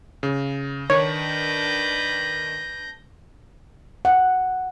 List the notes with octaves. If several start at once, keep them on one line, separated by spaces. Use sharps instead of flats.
C#3
D#3 D4 B4 C#5 G6 A#6
F#5